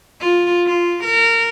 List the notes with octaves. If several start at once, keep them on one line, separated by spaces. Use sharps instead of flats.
F4
F4
A#4